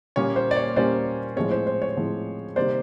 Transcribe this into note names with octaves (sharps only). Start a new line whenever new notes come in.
A#2 G3 A#3 C#4 C#5
C5
D5
C#5
A#2 G3 A#3 C#4 C5 D5
A2 F3 G#3 C4 C#5
C5
C5
C#5
A2 F3 G#3 C4
C3 D#3 G3 A#3 C5 D5